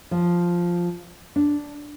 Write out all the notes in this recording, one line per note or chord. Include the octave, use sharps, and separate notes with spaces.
F3
D4